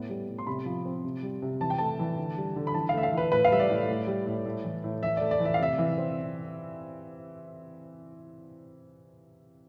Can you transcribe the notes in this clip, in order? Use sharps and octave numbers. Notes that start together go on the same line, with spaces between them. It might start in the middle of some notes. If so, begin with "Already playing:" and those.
Already playing: A2 B3
G3
A2
C6
C3 B5
F3
C4
C3
G3
C3
E3 A5
G5
A3 A5
E3
D3
G3
D3
B5
E3 A5
F5
A3 E5
F5
E3 B4
A2 B4
F5
G3 E5
D5
A2
A2
G3
A2
A2
E3
A2
E3 E5
A3 D5
D5
E3
E5
F5
C3 E5
E3
C4